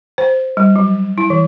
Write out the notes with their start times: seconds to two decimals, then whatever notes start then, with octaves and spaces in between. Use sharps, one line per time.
0.18 C5
0.57 G3
0.76 F#3
1.18 E4
1.30 E3